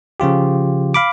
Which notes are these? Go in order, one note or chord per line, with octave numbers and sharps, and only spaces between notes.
C#3 F3 F4 G4
F5 B5 D6